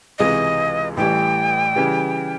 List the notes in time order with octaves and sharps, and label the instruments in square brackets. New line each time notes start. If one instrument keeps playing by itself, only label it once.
[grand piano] C#2 C3 E3 G#3 [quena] D#5
[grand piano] A1 A2 E3 G3 [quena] G5
[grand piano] C#3 E3 G3